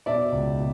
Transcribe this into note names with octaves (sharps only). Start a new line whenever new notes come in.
B2 D5 E5
C#2
B2